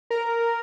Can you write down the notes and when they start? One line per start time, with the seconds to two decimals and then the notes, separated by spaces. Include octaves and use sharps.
0.10 A#4